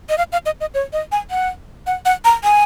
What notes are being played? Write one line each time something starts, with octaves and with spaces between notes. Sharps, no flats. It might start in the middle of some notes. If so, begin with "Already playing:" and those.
D#5
F5
F5
D#5
D#5
C#5
D#5
G#5
F#5
F#5
F#5
A#5
G#5